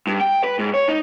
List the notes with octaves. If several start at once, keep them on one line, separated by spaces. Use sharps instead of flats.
G2
G5
B4
G#2
C#5
D#4